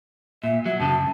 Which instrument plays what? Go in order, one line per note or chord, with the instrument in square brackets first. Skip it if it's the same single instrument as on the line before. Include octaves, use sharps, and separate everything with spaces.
[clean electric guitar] A#2 [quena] E5
[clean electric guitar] F#3 [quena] E5
[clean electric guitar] F#2 C#3 [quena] A5